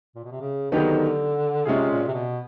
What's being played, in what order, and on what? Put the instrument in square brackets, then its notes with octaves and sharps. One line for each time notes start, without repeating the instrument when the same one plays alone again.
[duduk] A#2
B2
C3
C#3
[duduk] D3 [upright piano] D#3 F#3 B3 D#4 G4
[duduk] C3 [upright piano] G#3 C#4 F4 G#4
[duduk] A#2
C3
B2